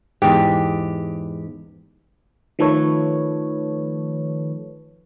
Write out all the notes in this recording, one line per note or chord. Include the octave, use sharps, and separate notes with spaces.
E2 G#2 G4
D#3 F3 A3 A4 B4 C#5